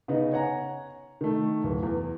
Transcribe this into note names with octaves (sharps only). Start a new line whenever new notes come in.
C#3 B3 D#4
C#5 F#5 G#5 A#5
D#3 A3
D1
E2